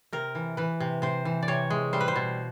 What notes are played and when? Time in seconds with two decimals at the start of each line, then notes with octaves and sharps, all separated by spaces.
0.13 C3 A#4
0.35 E3
0.57 E3 B4
0.80 C3
1.02 C3 C5
1.25 E3
1.43 D5
1.48 C3 C#5
1.70 G#3
1.93 G3 C5
2.01 B4
2.08 C5
2.16 B2